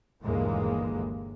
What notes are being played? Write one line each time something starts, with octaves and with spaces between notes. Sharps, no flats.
G1 D#2 A#2 E3 G#3 A#3